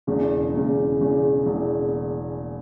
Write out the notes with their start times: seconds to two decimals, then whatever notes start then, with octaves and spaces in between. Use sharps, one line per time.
0.07 E1 E2 C#3
0.54 E1 E2 C#3
1.00 E1 E2 C#3
1.46 E1 E2 C#3